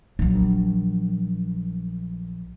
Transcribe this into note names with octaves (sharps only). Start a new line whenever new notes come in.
A#1 F#3